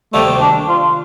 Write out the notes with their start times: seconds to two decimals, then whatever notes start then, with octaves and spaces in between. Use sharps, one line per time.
0.13 D2 C3 D#3 G3 A3 A#3
0.41 D4
0.68 F4